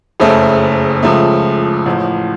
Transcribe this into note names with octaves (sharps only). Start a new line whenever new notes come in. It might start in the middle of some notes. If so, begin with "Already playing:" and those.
F#1 F2 C#3 A3
C#2 C#3 F3 A3
A1 A2 F3